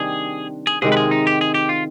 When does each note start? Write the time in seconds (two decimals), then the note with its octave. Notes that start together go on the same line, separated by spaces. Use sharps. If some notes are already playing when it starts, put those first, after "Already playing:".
Already playing: C3 D#3 G3 D4 G#4
0.67 G#4
0.82 C3 D#3 G#3 G#4
0.92 B4
0.97 G#4
1.11 D#4
1.27 G4
1.41 G#4
1.54 G4
1.69 F4